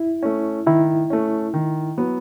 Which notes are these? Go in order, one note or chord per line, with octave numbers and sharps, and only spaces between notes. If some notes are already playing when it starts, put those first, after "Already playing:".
Already playing: E4
A3 C#4
D#3 E4
A3 C#4
D#3
F#3 B3